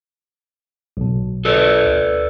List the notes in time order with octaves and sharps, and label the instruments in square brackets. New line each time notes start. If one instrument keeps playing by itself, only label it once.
[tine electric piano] B1 B2
[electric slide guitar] A4 B4 D5
[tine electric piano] D2